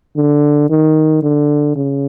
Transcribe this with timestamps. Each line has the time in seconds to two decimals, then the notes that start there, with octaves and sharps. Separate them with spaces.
0.17 D3
0.70 D#3
1.23 D3
1.76 C#3